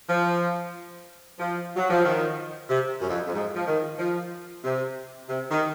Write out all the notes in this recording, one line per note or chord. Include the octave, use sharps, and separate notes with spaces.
F3
F3
F#3
F3
D#3
C3
F#2
F2
F2
G#2
F3
D#3
F3
C3
C3
D#3